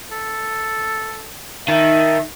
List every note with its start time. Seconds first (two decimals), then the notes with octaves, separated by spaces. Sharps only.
0.11 A4
1.68 D#3 E5 A5